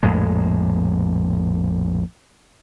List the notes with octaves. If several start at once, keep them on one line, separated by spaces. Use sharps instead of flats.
A#1 F2 A2 G#3